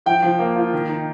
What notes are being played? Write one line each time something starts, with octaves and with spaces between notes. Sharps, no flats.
F3 G5
F3
A#3
F4
D#3
D#4